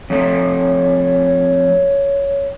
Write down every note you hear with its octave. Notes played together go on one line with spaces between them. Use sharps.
F2 A3 C#5